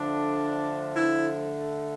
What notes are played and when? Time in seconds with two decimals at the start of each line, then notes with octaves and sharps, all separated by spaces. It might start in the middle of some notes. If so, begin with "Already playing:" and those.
Already playing: D3 F3 A3 D4
0.95 E4